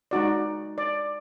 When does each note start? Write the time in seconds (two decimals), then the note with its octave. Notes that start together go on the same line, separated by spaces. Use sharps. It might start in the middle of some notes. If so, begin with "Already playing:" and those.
0.11 G#3 D#4 F#4 D5
0.78 D5